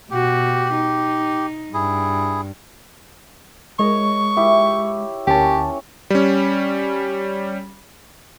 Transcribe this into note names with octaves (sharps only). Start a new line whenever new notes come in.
B2 F#4 G4
D#4
G2 E4 G#4
G#3 C#5 D#5 C#6
E4 G4
D2 C#4 G4 C#5 A5
G3 C#4